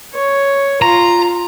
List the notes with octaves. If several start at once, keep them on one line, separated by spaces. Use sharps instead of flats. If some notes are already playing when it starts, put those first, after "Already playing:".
C#5
F4 A#5